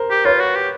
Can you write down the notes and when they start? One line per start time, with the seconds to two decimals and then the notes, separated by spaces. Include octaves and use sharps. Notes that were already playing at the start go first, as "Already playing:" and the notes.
Already playing: A#4 C5
0.10 G4
0.25 F4 B4 C#5
0.40 F#4
0.55 G4